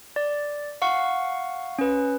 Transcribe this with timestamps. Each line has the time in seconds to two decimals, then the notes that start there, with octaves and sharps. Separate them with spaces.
0.16 D5
0.82 F5 F#5 C#6
1.79 C#4 B4